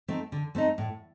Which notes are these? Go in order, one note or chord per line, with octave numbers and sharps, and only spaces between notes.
A3 C4 D#4
D3
A3 C4 D#4
A2